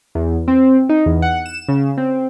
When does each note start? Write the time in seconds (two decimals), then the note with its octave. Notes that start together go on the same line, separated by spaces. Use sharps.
0.15 E2
0.48 C4
0.89 D#4
1.06 E2
1.22 F#5
1.46 E7
1.68 C#3
1.97 C4